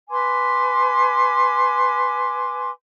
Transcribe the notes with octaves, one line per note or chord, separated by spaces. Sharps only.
B4 G#5 C6 D6